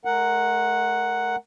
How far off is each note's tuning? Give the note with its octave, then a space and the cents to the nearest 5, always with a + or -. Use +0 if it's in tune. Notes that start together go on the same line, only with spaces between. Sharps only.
A3 -40 A#4 +0 F#5 +0